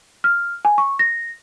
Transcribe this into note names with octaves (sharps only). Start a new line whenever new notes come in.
F6
G#5
C#6
A#6